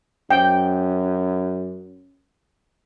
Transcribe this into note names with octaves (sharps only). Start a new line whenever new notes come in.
F#2 G5